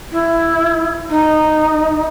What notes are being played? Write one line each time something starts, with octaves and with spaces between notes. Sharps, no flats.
E4
D#4